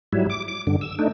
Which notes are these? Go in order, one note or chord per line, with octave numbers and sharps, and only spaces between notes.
G#2 F#3 G3 E4
D6
D6
G2 D3
E6
A3 D4 D#4